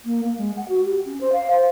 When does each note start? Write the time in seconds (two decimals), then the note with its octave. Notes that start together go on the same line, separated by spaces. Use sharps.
0.05 A#3
0.24 A#3
0.37 G#3
0.56 F#5
0.68 F#4
0.84 G4
1.05 C#4
1.20 C5
1.32 F5
1.50 C5